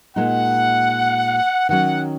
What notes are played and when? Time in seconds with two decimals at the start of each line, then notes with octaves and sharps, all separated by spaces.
0.16 A#2 G#3 D#4 F#5
1.69 D#3 F#3 C#4 F#5